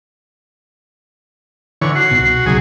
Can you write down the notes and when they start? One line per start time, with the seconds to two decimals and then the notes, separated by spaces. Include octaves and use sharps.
1.81 D3 E3 C#5
1.95 F#4 C7
2.11 C2 B2
2.46 B1 A#2 C#3 F#3 G#4